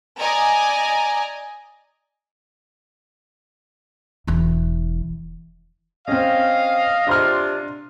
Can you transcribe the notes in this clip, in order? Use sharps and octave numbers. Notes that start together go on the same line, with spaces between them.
D5 D#5 G#5 A#5
E1 E3
C4 C#4 D#5 F5
C3 D4 F4 D#5 C6 F6